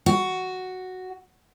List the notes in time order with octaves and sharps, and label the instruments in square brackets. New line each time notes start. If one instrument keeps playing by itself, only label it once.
[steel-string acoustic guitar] F#4